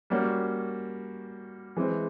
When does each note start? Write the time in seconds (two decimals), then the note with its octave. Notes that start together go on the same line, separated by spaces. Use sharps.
0.10 G3 A#3 C#4 F#4
1.76 E3 G#3 C4